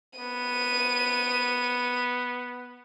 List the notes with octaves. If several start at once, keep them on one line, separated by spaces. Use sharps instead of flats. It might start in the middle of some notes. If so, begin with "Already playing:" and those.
B3 D#7